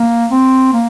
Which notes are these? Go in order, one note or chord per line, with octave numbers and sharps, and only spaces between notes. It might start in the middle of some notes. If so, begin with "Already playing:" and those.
Already playing: A#3
C4
A#3